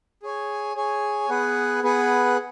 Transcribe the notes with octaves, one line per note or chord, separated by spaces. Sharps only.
G#4 C#5 G#5
G#4 C#5 G#5
B3 G#4 B4 F#5
B3 G#4 B4 F#5